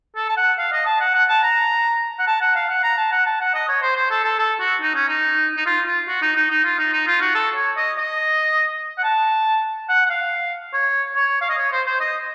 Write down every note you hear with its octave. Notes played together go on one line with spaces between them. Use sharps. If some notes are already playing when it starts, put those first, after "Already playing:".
A4
A5
F#5
F5
D#5
A5
F#5
F#5
A5
A#5
F#5
A5
F#5
F5
F#5
A#5
A5
F#5
A5
F#5
D#5
C#5
C5
C5
A4
A4
A4
F#4
D#4
C#4
D#4
D#4
F4
F4
F#4
D#4
D#4
D#4
F4
D#4
D#4
F4
F#4
A4
C#5
D#5
D#5
F#5
A5
F#5
F#5
F5
C#5
C#5
F5
D#5
C#5
C5
C5
D#5